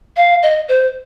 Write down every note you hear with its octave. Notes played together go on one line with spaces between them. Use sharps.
F5
D#5
C5